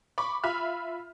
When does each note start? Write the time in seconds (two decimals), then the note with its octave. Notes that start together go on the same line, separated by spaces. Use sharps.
0.18 B5 C#6 D6
0.44 F4 E5 B5 F6